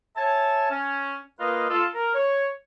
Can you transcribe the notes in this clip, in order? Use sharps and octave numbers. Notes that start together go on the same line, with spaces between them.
C#5 E5 G#5 A5
C#4
A#3 F4 B4 D#5
F4 A4
A#4
C#5